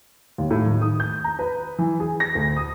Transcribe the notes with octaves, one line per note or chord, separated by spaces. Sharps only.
D#2
A2
D#3
D#6
G6
A#5
B4
E3
G#4
A#6
D2
D#6